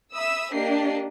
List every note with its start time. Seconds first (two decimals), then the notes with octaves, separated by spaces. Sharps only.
0.13 E5 B5 D#6 E6
0.53 A#3 D4 G4 D#5 C7